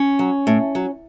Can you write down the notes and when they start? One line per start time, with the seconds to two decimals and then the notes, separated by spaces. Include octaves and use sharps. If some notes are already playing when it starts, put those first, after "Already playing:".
Already playing: C#4
0.19 F#3
0.47 A2
0.75 F#3